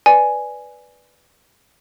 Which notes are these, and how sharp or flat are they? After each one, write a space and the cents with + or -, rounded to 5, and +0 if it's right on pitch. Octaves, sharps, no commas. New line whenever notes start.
B4 +0 D5 +0 G#5 +0